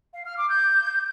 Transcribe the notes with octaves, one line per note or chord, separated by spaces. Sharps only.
F5
F6
D6
G6